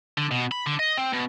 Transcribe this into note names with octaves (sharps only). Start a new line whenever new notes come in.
D3
B2
B5
D3
D#5
C4
B2